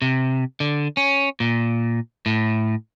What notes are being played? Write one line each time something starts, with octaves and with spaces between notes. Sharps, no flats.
C3
D3
C#4
A#2
A2